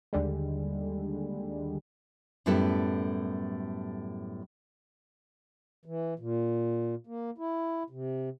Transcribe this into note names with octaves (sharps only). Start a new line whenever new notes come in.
D#2 D3 G3 G#3
F#2 A2 G3 B3 E4 A4
E3
A#2
A#3
E4
C3